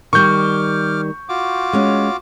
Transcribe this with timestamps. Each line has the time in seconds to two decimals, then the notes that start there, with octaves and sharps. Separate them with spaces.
0.13 D#3 G3 C#6 D6 F6 G6
1.29 F4 F#4 D6
1.73 G#3 C#4